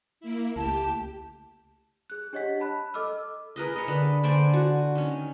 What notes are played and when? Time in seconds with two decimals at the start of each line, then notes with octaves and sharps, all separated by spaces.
0.20 A#3 E4
0.56 C#2 A3 G4 A5
2.10 G#4 F#6
2.33 D4 G4 C#5 D#5 F#5 B6
2.60 A5 B5 F#6
2.94 A4 D#5 D6 E6 F6
3.56 G#4 A#4 B4 D#5
3.76 C#5 D#5
3.88 D3 B4
4.24 D3 C5 D5 G#5
4.54 F#4
4.95 D#3 C#4